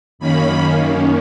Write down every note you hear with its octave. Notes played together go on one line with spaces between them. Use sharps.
F#2 D#3 A#3 C#4 B5